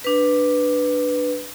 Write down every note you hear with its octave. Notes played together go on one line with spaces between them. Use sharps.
D4 B4